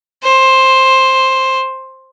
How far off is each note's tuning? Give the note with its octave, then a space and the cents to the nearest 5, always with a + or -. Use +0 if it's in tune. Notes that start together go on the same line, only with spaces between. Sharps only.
C5 +10